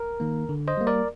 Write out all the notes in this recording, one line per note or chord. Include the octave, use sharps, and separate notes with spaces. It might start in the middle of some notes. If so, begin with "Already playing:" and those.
Already playing: A#4
D#3 A#3
D3
C5 D#5
G3 A#3
A#4 D5